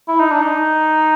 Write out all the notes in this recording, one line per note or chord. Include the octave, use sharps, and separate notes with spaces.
E4
D#4
D4
D#4